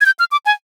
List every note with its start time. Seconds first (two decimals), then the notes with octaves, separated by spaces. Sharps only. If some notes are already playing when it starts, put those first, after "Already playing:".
0.01 G#6
0.06 G6
0.19 F6
0.32 D6
0.46 G#5